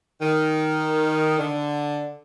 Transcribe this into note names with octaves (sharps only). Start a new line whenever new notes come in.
D#3
D3